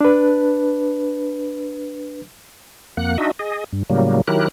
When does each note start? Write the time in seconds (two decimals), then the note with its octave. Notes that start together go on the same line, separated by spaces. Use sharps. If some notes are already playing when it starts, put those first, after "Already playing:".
0.01 D4 B4
2.97 F2 A#3 F#5 F#6
3.18 D4 D#4 F#4 D#5 E5
3.39 G#4 D#5
3.72 G2
3.90 A2 C#3 F#3 G3 A#3
4.28 D#3 F#3 E4 G4 A#4 F#6